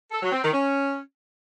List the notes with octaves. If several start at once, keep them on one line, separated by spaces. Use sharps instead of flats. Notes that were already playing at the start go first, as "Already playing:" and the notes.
A4
F#3
C4
D#3
C#4